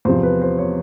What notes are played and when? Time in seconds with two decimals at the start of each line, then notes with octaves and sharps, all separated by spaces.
0.05 E2 C3 F3 C5
0.23 B4
0.42 C5
0.58 C#5